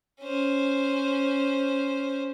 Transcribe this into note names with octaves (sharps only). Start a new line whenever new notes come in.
C#4 C5